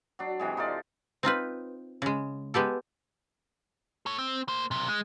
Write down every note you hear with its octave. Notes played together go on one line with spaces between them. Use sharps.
F#3 D4
C3 E3 G#3
D#4 F4 A4 D5
C4 D#4 F4 B4
C#3 G#3
G#3 B3 G4 A4
A4 C#5
C4
A#3 C5
B1 C3
G#3